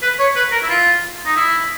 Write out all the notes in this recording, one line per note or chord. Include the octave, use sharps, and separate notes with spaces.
B4
C#5
B4
A#4
E4
F4
D#4
E4